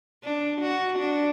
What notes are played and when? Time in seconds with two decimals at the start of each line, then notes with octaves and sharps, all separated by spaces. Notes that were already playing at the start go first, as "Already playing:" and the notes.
0.24 D4
0.61 F#4
0.99 D4